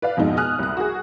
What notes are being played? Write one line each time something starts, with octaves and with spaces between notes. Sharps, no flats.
B4 D5 F5
F2 G#2 B2 D#4
G#5 D#6 F6 F#6
C2 F#6
F#4 G#4